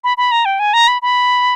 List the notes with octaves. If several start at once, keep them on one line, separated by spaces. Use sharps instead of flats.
B5
B5
A#5
G5
G#5
A#5
B5
B5